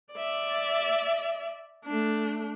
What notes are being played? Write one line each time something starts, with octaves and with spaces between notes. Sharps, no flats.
D5 E5
A3 D4